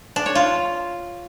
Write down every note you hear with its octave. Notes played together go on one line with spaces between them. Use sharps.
D4
C#5
F4